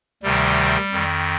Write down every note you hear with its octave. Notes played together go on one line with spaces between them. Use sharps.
D2 C3 D#3 G3
F2 D#3